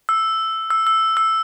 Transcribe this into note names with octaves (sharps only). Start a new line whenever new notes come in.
E6
E6
E6
E6